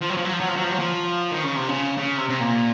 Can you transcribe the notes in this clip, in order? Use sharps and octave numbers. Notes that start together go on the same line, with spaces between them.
F3
F#3
F3
F#3
F3
F#3
F3
F#3
F3
F#3
F3
D#3
C#3
C3
C#3
C#3
C3
C3
A#2